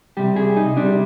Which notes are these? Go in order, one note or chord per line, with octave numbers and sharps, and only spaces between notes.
C2 C3 G3 G4
G#4
D#4
C2 C3 G3 D4